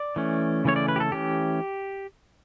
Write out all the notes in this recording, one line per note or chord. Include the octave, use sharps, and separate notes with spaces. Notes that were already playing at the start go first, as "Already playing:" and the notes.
Already playing: D5
E3 A3 C#4
C#3 E3 A3 C#4 C#5
D5
B4
G4
A4
E3 A3 C#4 G4